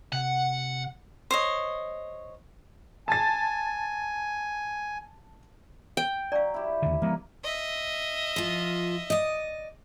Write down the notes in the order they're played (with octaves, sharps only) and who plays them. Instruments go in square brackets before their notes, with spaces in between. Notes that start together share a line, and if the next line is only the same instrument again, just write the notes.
[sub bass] C3 [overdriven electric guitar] F#5
[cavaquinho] C5 C#5 D#5
[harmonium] G#5 [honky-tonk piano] A5 A6
[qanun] G5
[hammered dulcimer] F#3 [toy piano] D5 F5
[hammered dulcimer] E4 G4
[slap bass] D#2 D3
[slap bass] F3 G#3 B3 [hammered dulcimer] A#3
[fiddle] D#5 E5
[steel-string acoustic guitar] F3 F4
D5 D#5